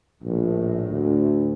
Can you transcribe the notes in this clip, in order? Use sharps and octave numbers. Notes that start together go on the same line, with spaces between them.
A#1 A2
D2